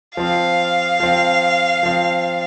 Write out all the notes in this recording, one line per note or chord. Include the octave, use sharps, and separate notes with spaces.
F3 C4 F5
F3 C4
F3 C4